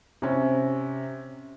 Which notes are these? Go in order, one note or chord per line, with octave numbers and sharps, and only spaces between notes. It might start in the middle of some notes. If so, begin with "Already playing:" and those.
C3 C#4